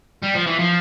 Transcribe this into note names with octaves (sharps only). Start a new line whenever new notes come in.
G3
F3
E3
F3